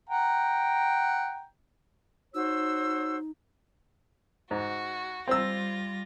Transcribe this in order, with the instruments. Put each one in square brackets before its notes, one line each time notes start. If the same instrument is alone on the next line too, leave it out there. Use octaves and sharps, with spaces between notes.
[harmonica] F#5 G5 A#5
[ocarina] D#4 [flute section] F#4 C5 C#5 [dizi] E6
[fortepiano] G#2 [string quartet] F#4
[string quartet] G3 F4 A#6 [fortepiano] C4 E6